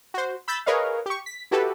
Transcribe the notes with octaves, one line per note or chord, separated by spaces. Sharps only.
F#4 C5
B5 E6 G6 A6 B6
G#4 A#4 B4 C#5 D#5 F5
G4 C#6
B6
E4 F#4 G4 A4 B4